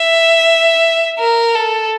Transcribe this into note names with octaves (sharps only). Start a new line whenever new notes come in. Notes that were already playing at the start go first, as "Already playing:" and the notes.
Already playing: E5
A#4
A4